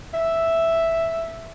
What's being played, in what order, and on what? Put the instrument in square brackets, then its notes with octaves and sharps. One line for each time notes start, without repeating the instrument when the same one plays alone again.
[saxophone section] E5